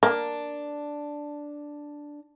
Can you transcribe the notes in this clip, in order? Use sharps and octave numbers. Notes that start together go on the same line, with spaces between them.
A#3 D4